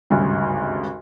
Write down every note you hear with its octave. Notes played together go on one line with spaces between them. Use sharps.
G#1 D2 G2 C#3